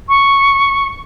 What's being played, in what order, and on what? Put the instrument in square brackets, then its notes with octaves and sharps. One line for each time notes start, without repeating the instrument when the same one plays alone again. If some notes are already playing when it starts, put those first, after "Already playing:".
[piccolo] C#6